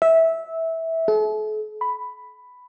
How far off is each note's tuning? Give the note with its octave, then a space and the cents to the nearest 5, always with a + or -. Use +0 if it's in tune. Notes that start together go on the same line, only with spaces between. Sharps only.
E5 -15
A4 -45
B5 +5